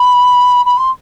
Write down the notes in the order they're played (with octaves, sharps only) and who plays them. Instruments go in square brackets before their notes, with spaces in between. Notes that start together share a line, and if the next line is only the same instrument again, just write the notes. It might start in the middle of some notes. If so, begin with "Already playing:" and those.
Already playing: [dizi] B5
B5
C6